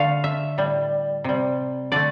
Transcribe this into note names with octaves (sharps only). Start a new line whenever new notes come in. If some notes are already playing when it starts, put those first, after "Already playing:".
Already playing: D3 A3 F5
E5
A2 G3
C3 G3
D3 A3 D5